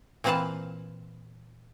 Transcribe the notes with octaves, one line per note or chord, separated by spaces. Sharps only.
A#2 E3 C4 B4 F5 A5